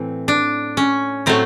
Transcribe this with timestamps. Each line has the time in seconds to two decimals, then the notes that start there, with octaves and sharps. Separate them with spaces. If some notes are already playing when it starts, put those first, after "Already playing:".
Already playing: A2 E3 A3 C4
0.28 D4
0.77 C#4
1.26 A2 F#3 A3 C4